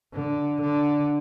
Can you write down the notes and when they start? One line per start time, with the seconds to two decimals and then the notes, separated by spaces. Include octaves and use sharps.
0.13 D3
0.61 D3